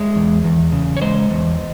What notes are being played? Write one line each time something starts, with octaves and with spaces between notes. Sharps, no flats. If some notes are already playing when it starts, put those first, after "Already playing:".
Already playing: G#3 C#5 E5
E2
E2
C#3
C#5
G#3 C5 D#5
E2